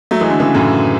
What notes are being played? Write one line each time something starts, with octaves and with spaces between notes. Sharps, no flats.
F#3 A3
E3 G#3
D3 F#3
C#3 E3
F#2 A2